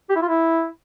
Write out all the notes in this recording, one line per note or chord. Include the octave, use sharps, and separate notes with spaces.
G4
E4
F4
E4